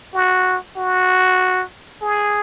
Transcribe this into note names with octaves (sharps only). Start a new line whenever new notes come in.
F#4
F#4
G#4